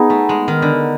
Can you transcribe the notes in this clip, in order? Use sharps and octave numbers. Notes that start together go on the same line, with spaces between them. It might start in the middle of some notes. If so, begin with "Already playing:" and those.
Already playing: B3 D#4 G#4
A3
G#3
D#3
D3